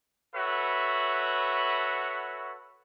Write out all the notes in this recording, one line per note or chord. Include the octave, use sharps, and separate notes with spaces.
F#4 A4 B4 C#5 E5 F#5